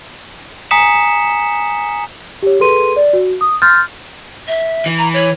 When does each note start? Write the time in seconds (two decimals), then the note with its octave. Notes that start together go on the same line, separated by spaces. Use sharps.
0.71 G#5 A#5 D#6 B6 C#7 E7
2.43 G4 C#5
2.60 G#4 A4 B4 C6 D#7
2.96 D5
3.13 F#4
3.41 D#6
3.62 C6 F6 G6 A6
4.48 E5
4.86 E3
4.98 A#5
5.13 C#5